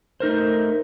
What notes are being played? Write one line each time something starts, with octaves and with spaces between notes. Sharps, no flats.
A3 D#4 A#4 C5